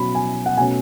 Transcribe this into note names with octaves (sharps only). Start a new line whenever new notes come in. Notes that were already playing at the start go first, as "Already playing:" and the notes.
Already playing: B2 F#3 C#4 B5
G#5
F#5
B2 A3 C#4 G#5